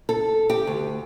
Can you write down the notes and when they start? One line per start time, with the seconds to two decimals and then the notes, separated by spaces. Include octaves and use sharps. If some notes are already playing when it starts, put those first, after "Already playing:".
0.09 A4
0.50 G4
0.67 D2